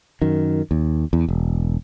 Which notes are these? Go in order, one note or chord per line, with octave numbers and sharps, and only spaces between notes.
F#2 D#3
D#2
E2
E1